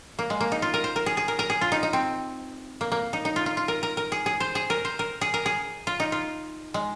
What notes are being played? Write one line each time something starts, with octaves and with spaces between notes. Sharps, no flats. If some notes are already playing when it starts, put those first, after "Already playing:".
A#3
G#3
A#3
D#4
F4
A#4
C5
A#4
G#4
G#4
A#4
A#4
G#4
F4
D#4
D#4
C4
A#3
A#3
D#4
D#4
F4
F4
F4
A#4
A#4
A#4
G#4
G#4
C5
G#4
A#4
C5
A#4
G#4
A#4
G#4
F4
D#4
F4
G#3